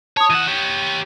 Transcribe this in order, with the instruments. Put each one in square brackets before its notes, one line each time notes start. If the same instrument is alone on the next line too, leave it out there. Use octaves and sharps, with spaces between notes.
[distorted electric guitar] C#5 [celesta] A5 D#6
[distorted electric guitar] E3 F#5 [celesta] D#7 E7
[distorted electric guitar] G4 C#5